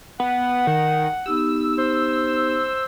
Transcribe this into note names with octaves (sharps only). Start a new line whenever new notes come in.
B3 F#5
D#3
B3 D#4 G4 E6
C5